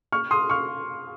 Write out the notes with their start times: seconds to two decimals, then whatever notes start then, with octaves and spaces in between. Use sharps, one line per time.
0.12 C#6 F6
0.31 C6 D#6
0.50 C#6 F6